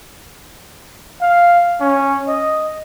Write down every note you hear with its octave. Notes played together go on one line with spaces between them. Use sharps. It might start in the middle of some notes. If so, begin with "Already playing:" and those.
F5
C#4
D#5